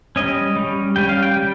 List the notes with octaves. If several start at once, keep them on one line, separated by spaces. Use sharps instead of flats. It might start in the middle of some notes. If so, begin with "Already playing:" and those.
G3 C#4 D#5
G3 C#4
G3 C#4 G5
F5
G5
G3